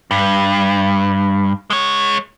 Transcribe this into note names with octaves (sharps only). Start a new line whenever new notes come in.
G2
G#3 C#5